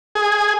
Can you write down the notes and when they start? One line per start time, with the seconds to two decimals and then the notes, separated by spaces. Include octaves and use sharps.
0.15 G#4